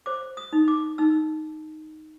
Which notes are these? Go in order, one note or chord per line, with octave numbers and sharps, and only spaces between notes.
C5 D6
D#6
D#4
D6
D#4 E6